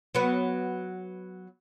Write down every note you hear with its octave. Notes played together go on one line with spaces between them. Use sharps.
F#3 B3